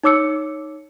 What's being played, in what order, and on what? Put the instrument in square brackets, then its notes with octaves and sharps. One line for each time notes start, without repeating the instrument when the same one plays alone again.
[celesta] D#4 C#5 D6 E6 C#7